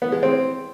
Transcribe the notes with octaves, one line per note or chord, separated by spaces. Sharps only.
B3
G#3
C4